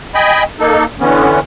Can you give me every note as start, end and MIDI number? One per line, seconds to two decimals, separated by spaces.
0.15 0.43 75
0.15 0.43 79
0.15 0.43 80
0.15 0.43 83
0.60 0.85 58
0.60 0.85 63
0.60 0.85 69
1.00 1.40 50
1.00 1.40 52
1.00 1.40 59
1.00 1.40 61